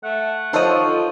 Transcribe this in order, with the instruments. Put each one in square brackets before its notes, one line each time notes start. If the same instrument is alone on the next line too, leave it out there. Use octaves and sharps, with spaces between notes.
[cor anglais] A3 [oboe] F#5
[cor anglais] F3 [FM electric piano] D#4 A4 [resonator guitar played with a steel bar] C5 C#5 D#5
[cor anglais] F4